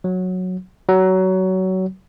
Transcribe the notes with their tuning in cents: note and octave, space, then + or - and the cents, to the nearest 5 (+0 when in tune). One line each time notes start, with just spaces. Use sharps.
F#3 -10
F#3 +20